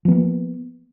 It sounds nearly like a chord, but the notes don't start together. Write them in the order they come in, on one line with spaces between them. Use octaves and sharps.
F3 B3 A#3